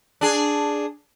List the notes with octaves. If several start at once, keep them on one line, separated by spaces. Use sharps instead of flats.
D4 G#4